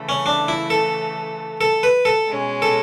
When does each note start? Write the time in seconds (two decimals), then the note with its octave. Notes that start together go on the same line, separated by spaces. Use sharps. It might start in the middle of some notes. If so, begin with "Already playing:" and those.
Already playing: C#3 E3 A3
0.09 C#4
0.26 D4
0.48 E4
0.70 A4
1.61 A4
1.83 B4
2.05 A4
2.28 B2 G#3 C#4
2.62 A4